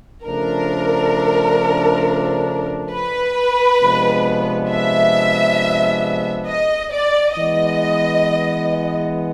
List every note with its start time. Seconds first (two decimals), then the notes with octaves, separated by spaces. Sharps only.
0.25 C#3 F3 A3 D4 A#4
2.92 B4
3.81 C3 F3 G#3 B3 D4
4.70 E5
6.48 D#5
6.93 D5
7.37 E3 G#3 B3 D#5